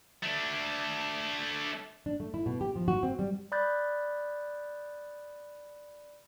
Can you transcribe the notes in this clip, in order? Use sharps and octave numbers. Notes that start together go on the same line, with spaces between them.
A3 D4
D4
A3
E4
B2
G4
F3
F#4
C4
G3
D5 B5 D#6 F#6 G6 A6